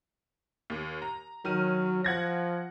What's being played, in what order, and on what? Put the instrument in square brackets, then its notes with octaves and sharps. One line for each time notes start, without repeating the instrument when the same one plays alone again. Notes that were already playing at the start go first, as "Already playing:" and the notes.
[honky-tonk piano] D#2
A#5
[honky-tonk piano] D#3 F6 D#7 [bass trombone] F#3
[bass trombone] F3 [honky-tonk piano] F#5 G#6 A#6